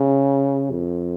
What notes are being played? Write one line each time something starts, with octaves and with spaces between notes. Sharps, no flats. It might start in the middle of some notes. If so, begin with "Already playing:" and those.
Already playing: C#3
F2